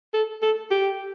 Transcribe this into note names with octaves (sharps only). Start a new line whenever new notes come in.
A4
A4
G4